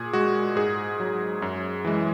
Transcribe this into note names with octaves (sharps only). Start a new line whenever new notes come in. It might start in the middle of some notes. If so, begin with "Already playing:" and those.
Already playing: A#2 G#4
G#3 F#4
G#2 G#4
F#3
F#2
E3 G#3